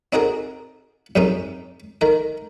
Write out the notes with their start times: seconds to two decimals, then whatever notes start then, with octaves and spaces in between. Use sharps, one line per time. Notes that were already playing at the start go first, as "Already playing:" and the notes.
0.13 C4 D#4 F#4 G#4 A#4
1.16 F#2 C3 G#3 C#4 D#4
2.01 D#3 A#4